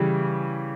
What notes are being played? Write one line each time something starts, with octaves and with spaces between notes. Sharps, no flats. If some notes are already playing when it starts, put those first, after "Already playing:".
Already playing: C#3 E3 G3